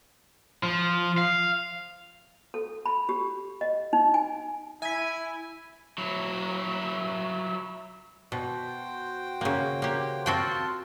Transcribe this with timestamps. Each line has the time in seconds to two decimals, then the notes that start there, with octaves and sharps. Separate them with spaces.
0.63 F3
1.17 F5
2.54 A4
2.86 B5
3.09 G4
3.61 D#5
3.93 D#4
4.14 G#5
4.82 E4 E5 G#5 B6
5.98 F#3 E4
8.32 B2 F#4 C5 G5
9.41 C#3 A#3
9.82 A#3 G4
10.26 C4 F4 F#4 G5 A5